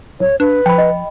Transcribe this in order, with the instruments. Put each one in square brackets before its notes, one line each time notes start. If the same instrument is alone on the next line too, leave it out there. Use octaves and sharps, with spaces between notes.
[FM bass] D1 [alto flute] C#5
[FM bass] D4 [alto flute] B4
[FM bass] F3 [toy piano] G5 B5
[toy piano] D#5